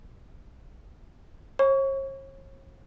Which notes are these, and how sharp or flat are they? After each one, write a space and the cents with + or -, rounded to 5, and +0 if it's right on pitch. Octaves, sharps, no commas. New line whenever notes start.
C#5 -40 C#6 +25